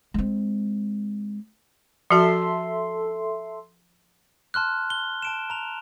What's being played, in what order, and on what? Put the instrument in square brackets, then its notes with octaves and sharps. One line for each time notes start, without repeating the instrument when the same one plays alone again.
[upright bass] G#3 C4
[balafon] F3 F#4 [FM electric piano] A4 E5 C6
[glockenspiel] A5 C6 F6 F#6
G7
A5 D7 E7
A#5 F7